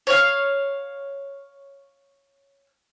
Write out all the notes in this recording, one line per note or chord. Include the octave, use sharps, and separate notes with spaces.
C#5 F5